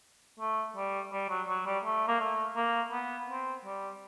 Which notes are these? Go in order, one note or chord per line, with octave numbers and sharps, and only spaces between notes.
A3
G3
G3
F#3
F#3
G3
A3
A#3
A3
A#3
B3
C4
G3